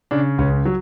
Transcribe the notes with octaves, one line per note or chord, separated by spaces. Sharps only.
C#3 D4
C#2 C#4
F#3